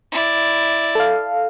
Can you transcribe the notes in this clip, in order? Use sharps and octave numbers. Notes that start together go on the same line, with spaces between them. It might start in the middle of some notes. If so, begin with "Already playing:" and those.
E4 D5
A4 F5